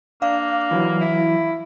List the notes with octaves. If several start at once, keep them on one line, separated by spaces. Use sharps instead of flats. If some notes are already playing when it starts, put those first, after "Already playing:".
A#3 D4 F5
E3 F#3
E4